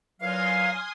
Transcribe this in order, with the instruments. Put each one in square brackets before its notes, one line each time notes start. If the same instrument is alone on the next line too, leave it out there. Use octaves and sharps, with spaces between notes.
[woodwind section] A#2 E3 F#3 [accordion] F5 [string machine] G#5 C6 D#6 [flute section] F6